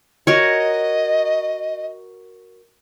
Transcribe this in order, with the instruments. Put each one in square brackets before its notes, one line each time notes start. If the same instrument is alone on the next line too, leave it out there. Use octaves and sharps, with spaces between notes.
[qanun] F#4 A#4 C#5 [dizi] D#5